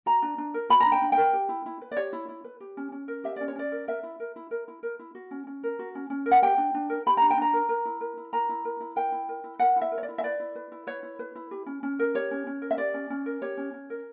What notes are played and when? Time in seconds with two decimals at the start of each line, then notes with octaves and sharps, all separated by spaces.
0.06 F#4 A#5
0.22 D4
0.38 D4
0.54 A#4
0.70 F#4 B5
0.80 A#5
0.86 D4
0.92 G5
1.02 D4
1.12 A#4 G5
1.33 G4
1.49 E4
1.66 E4
1.81 B4
1.92 D5
1.97 G4 C#5
2.13 E4
2.29 E4
2.44 B4
2.60 G4
2.77 C#4
2.92 C#4
3.08 A#4
3.24 G4 E5
3.36 C#4 D5
3.48 C#5
3.56 C#4 D5
3.72 A#4
3.88 A#4 E5
4.03 E4
4.20 A#4
4.36 E4
4.51 A#4
4.68 E4
4.83 A#4
4.99 E4
5.15 F#4
5.31 C#4
5.47 C#4
5.63 A#4
5.79 F#4
5.95 C#4
6.10 C#4
6.26 A#4
6.31 F#5
6.42 G4 G5
6.58 D4
6.74 D4
6.90 A#4
7.06 G4 B5
7.17 D4 A#5
7.30 G5
7.37 D4 A#5
7.53 A#4
7.69 A#4
7.85 E4
8.01 A#4
8.17 E4
8.33 A#4 A#5
8.49 E4
8.65 A#4
8.80 E4
8.96 A#4 G5
9.12 E4
9.29 A#4
9.44 E4
9.59 A#4 F#5
9.76 E4
9.81 E5
9.92 A#4
9.98 C#5
10.03 D5
10.09 E4
10.18 E5
10.24 B4 D5
10.40 E4
10.55 B4
10.72 E4
10.87 B4 C#5
11.03 E4
11.19 B4
11.35 E4
11.51 G4
11.66 C#4
11.83 C#4
11.99 A#4
12.15 G4 C#5
12.31 C#4
12.47 C#4
12.62 A#4
12.71 E5
12.78 G4 D5
12.94 C#4
13.10 C#4
13.26 A#4
13.42 G4 C#5
13.57 C#4
13.74 C#4
13.90 A#4